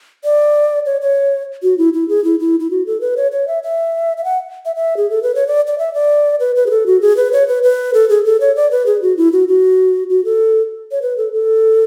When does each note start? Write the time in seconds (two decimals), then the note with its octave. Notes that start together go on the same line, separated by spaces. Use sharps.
0.24 D5
0.86 C#5
1.01 C#5
1.63 F#4
1.78 E4
1.93 E4
2.09 G#4
2.24 E4
2.40 E4
2.60 E4
2.71 F#4
2.86 A4
3.01 B4
3.17 C#5
3.32 C#5
3.48 E5
3.63 E5
4.17 E5
4.24 F#5
4.65 E5
4.76 E5
4.97 G#4
5.10 A4
5.23 B4
5.35 C#5
5.47 D5
5.67 D5
5.78 E5
5.94 D5
6.40 B4
6.56 B4
6.66 G#4
6.70 A4
6.86 F#4
7.01 G#4
7.17 B4
7.33 C#5
7.48 B4
7.63 B4
7.94 A4
8.09 G#4
8.25 A4
8.40 C#5
8.56 D5
8.71 B4
8.86 G#4
9.02 F#4
9.17 E4
9.32 F#4
9.48 F#4
10.10 F#4
10.25 A4
10.91 C#5
11.02 B4
11.17 A4
11.33 A4